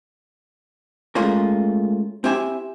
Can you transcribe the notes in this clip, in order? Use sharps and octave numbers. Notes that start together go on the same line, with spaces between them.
G#3 A3 C#4 F4 A#4
C4 E4 G4 E5 G#5